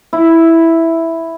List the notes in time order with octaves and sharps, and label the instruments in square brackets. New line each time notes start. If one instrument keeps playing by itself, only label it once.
[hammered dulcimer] E4